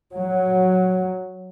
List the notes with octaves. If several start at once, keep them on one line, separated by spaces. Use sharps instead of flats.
F#3